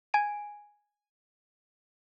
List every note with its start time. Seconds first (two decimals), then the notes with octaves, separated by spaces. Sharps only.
0.14 G#5 D7